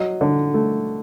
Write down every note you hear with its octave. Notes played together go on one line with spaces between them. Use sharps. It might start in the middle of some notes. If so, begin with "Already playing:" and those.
Already playing: F#3 D#5
D3
A3